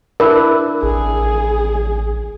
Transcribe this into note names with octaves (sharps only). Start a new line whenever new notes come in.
D4 E4 A#4 B4
A1 G#4